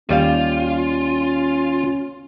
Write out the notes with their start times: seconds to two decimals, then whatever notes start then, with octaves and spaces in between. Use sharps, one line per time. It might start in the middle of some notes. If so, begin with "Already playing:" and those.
0.09 D#2 G3 C#4 F4 F5